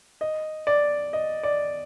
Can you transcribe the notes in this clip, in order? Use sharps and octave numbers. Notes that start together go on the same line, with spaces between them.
D#5
D5
D#5
D5